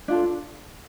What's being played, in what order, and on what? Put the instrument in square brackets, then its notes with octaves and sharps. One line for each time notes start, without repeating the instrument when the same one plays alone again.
[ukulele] D4 F4 A4